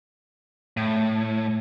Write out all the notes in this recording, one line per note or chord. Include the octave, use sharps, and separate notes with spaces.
A2